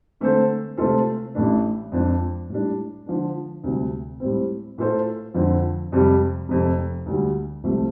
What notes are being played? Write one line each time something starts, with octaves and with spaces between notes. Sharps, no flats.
D3 A3 C4 A4 C5
C3 A3 C4 F4 A4
A1 A2 A3 D4
F2 F3 D4
A2 G3 D4
D3 F3 D4
D2 C3 G3 D4
A2 G3 C4
A2 A3 F4 A4 C5
F2 D3 F3 C4
F2 C3 G3
F1 F2 C3
D2 D3 G3
C2 C3 F3 A3